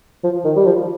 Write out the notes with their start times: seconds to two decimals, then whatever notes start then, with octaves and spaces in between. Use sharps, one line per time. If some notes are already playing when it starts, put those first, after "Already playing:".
0.24 F3
0.45 D#3
0.56 G3
0.66 F3